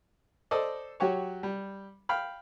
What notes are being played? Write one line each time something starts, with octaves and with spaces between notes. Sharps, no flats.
A4 C5 D5 D#5
F#3 F#4 G4 C#5
G3
F5 G5 B5 F6